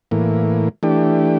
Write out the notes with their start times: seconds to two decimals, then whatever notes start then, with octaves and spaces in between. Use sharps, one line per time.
0.11 A2 E3 A#3
0.83 E3 A3 D4 G4